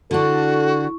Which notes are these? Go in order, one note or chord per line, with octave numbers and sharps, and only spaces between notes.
D3 D4 E4 F#4 A4 C#6